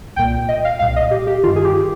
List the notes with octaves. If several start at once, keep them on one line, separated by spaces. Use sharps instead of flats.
C2 A#2 G5
D#5
F5
C2 A#2 F5
D#5
G4
G4
G2 D#3 F4
G#4
G4